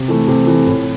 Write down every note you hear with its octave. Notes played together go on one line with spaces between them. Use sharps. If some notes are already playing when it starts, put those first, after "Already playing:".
Already playing: C3
E3 A3
C3
E3 A3
A2